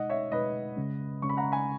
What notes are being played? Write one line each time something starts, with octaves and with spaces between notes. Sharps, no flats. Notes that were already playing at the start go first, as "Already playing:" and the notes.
Already playing: B2 G#3 D#4 D#5 F#5
C#5 E5
B2 G#3 D#4 B4 D#5
C#3 G#3 C#4
C#3 G#3 C#4 C#6
B5
F#5 A#5
G#5 B5